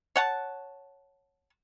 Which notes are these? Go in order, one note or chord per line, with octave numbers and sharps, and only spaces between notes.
C#5 F#5 A5